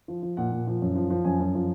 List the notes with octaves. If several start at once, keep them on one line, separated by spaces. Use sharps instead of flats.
F3
F3
A#2 F#5
A#2
F3
F#2
F3
F3
F#2 G#5
F#2
F3